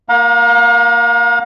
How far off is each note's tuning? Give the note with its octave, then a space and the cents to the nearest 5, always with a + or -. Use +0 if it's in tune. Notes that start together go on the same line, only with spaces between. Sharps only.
A#3 +0 F5 +45 A#5 +25